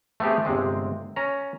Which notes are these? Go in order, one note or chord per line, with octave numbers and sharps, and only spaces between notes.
A3 B3 C4 G4 G#4
G1 C3 G#3 C4
C#4 A#5